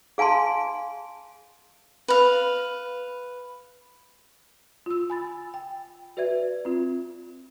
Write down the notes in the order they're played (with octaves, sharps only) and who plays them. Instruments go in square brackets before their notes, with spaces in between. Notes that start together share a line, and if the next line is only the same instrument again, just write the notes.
[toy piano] G#4 F5 G#5 A5 C6
[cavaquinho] B4 F5
[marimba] F4 E6
G#5 B5 A6
G5
F#4 B4 D5 E5 G#6
C4 F4